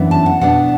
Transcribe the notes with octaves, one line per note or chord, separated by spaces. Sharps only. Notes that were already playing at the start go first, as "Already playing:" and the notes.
Already playing: F#2 E3 B3 D4
A5
F#5
B2 B3 D4 F#5